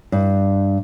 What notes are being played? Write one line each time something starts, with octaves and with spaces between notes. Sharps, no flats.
G2